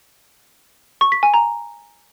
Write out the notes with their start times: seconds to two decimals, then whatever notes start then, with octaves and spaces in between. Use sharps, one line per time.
1.01 C#6
1.12 B6
1.23 G#5
1.34 A#5